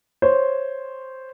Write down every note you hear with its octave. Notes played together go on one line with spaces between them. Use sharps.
C5 C#5